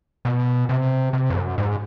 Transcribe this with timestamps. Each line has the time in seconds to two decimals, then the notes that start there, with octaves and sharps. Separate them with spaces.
0.25 B2
0.69 C3
1.13 C3
1.30 F2
1.36 F#2
1.58 G#2